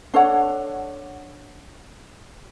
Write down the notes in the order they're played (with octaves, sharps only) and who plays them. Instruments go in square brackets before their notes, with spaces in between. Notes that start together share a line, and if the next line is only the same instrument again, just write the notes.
[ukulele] D4 A4 C#5 F#5